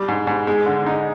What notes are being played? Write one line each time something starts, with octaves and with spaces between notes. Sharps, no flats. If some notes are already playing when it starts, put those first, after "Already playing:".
Already playing: G3
G#2
G#2
G#3
D3
D#4